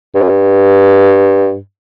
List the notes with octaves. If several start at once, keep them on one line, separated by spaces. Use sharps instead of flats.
G2
F#2
G2